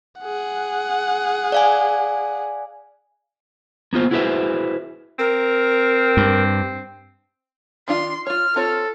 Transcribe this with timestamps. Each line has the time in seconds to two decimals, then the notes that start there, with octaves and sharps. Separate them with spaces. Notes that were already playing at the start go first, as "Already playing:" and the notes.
0.20 G#4 F#5
1.52 D5 F5 G#5
3.93 A#3 B3 F4 C5
4.11 E4 F#4 G#4 B4 C5 E5
5.19 C4 A#4
6.17 G2
7.88 D#3 D4 F4 C6
8.27 F4 C#5 F6
8.56 C4 F4 A4 C#5